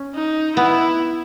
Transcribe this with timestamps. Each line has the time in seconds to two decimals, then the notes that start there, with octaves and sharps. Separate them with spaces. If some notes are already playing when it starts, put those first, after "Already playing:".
Already playing: C#4
0.15 D#4
0.56 B3 E4